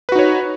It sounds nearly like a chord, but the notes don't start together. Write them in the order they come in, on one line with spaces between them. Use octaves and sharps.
B4 F#4 D#4 C#5